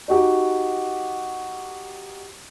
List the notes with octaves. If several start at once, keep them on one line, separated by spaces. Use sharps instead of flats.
D#4 F#4 G4